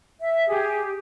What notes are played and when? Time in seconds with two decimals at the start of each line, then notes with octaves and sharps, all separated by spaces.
0.20 E5
0.48 G4 G#4